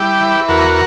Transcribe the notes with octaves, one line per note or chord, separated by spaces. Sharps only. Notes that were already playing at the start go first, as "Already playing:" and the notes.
Already playing: G3 E4 G4
E3
E2 F#4 A#4